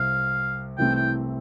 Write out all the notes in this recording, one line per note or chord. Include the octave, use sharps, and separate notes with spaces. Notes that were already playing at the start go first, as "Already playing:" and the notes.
Already playing: C2 C3 F5
C2 C3 E3 A3 C4 G5
G5